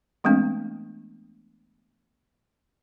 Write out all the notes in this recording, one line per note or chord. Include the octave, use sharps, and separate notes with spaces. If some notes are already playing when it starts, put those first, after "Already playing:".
E3 G#3 A3 B3 C4 D4